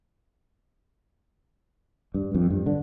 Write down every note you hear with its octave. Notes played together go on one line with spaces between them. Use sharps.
G2
F2
G2
D3